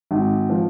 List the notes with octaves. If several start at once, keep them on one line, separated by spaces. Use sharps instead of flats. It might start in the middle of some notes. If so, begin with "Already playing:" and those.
G#1
F3